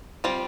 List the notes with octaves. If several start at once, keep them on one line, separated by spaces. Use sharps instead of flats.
G3 C4 F4